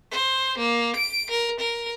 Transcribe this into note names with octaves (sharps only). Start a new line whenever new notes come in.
C5
A#3
D7
A#4
A#4